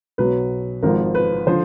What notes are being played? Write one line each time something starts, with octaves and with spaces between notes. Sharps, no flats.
B1 B2 F#3 B4
G#1 G#2 F3 A#4
B4
D3 F3 C5